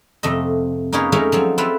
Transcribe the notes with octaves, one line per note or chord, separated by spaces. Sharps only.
F2 C3 A3 D#5
A#3 C#4 D#4 G#4 B4 C#5
G#3 A3 C#4 D#4 A4 A#4
F3 F#3 C4
C4 E4 F4 A4 B4